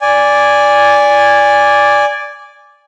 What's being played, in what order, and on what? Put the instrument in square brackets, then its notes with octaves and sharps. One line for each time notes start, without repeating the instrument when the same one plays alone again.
[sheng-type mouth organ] D5 G#5